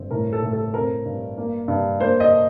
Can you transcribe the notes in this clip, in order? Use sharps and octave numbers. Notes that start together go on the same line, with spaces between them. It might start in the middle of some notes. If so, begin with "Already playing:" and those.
Already playing: G1 C4
A2 A#4
A4
A2
A4
C4 A#4
G2
A#3
G2
A#3 C5
D#5